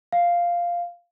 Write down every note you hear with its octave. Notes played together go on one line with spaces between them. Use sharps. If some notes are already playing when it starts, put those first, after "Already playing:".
F5